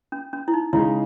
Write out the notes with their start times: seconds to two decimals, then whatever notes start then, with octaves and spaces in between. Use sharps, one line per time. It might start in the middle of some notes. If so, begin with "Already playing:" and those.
0.12 C#4
0.33 C#4
0.48 E4
0.54 D#4
0.73 C#3 G#3 D#4 E4 G#4